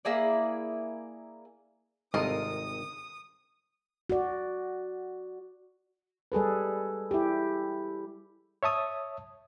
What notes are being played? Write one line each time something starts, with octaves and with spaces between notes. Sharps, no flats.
A#3 E4 G#4 D5
G#1 C3 G3 F4 A4 A#4 D#5 D#6
F#4 D5
G3 G#4 A4 B4
E4 G4
C#5 E5 A5 D#6